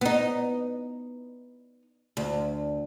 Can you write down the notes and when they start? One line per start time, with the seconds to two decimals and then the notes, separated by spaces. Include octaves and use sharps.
0.01 B3 D#4
2.17 D2